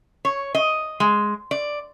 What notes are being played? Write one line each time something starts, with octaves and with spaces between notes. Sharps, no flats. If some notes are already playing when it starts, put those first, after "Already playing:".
C#5
D#5
G#3
D5